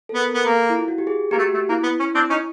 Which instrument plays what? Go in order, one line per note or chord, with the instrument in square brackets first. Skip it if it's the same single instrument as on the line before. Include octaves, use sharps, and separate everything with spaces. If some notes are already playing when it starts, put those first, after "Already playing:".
[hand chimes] A4
[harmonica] B3 [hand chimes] A#4
[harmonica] B3 [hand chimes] A#4
[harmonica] A#3 [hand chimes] A4
[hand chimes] E4
F4
F#4
G4
G#4
[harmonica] A#3 [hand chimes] G4
[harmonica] A3 [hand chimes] F#4
[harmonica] A3
[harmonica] A#3 [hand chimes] E4
[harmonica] B3
C#4
C4 D4
C#4 D#4